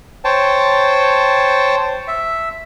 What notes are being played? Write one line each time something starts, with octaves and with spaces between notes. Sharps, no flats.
C5 C#5 G5 A5
E5